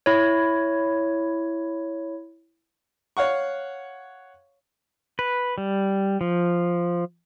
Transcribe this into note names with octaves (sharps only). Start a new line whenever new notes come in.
E4 C#5
C#5 F5 F#5 C#6
B4
G3
F3